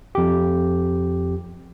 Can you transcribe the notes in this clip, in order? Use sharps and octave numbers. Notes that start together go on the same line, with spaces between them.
F2 G4